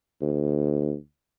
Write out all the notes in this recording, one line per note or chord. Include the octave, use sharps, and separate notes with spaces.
D2